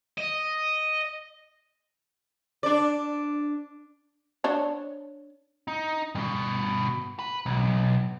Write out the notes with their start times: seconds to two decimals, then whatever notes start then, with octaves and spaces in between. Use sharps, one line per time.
0.18 D#5
2.63 D4 D5
4.44 D4 C5 C#5
5.68 D#4
6.15 G2 B2
7.19 B4
7.46 B1